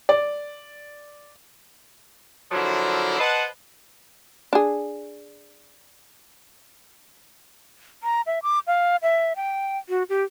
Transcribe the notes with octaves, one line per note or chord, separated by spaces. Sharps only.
D5
D3 F3 F#3 E4 A#4 C5
B4 C5 D#5 F#5 A5
D4 G#4
A#5
E5
D6
F5
E5
G5
F#4
G4